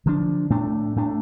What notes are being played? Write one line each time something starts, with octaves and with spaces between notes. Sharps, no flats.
D3 F3 D4
A2 A3 D4
A2 A3 D4